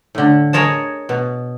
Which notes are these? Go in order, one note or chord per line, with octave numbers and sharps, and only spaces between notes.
A2 D3
G#4 A#4 C#5 D#5 A5
B2